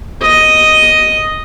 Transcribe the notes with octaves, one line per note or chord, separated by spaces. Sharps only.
D#5